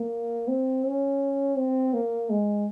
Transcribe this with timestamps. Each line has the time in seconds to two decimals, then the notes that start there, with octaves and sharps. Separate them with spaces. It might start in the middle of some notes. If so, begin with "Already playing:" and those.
Already playing: A#3
0.48 C4
0.85 C#4
1.57 C4
1.94 A#3
2.30 G#3